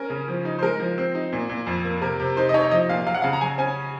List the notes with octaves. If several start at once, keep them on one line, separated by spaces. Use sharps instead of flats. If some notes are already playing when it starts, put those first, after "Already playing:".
Already playing: C#4 A#4
C#3
F3
D#4
C5
G#3 A#4
F3
C4
D#4
A#2
A#2
F2
A#3
C3 A#4
C3
D#4 C5
D#5
D#4 C#5
F3 D#5
A#2 F5
F#3 F5
F#5
C#3 F5
A#5
F#3 G#5
C#4 G#5